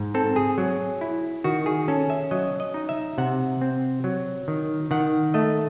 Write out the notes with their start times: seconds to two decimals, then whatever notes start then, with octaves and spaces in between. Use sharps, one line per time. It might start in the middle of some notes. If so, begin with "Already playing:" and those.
Already playing: G#2
0.14 C4 A4
0.36 G#4
0.58 F#3
1.01 E4
1.44 D#3 F#4
1.66 G#4
1.88 C#4 A4
2.10 E5
2.31 F#3 D#5
2.60 D#5
2.74 D#4
2.89 E5
3.18 C3 F#5
3.61 C4
4.04 F#3
4.48 D#3
4.91 D#3 F#5
5.34 A3 D#5